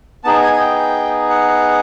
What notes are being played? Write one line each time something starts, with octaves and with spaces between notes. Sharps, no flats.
B3 D#4 G#4 A5
G#5
G#5
G5
F#5